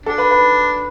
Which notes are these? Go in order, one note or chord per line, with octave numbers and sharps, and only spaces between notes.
D4 A4
B4
B4